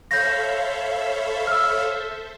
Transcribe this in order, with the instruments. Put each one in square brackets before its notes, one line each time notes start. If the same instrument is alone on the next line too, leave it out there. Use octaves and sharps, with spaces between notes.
[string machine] A4 C5 E5 [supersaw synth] C#5 F5 B5 [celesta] G6 A#6
[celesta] E6 F6